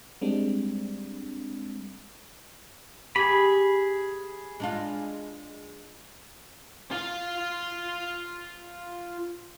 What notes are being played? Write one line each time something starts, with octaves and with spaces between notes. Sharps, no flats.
G3 G#3 C4 D4
G4 G#4 B5
G#3 D4 F4
F4 F5